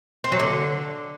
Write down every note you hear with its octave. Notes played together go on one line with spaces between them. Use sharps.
C4
F#3
D3